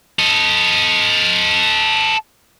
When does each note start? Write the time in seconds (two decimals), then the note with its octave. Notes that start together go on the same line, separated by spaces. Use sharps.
0.19 A4 D#5